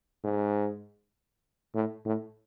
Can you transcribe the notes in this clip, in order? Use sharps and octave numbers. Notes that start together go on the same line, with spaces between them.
G#2
A2
A2